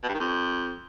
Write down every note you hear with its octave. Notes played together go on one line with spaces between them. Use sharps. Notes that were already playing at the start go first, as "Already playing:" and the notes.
B2
G2
D#3
F2